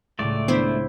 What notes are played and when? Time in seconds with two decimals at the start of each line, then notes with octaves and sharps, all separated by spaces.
0.19 C#2 A2 C#3 A3 D5
0.48 D#3 B3 D4 E4 C5